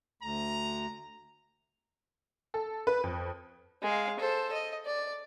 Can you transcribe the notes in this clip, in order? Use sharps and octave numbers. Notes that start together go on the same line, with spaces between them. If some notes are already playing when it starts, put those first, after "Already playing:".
D2 A#5
A4
B4
F2
G#3 F5
A4 C5
D#5
D5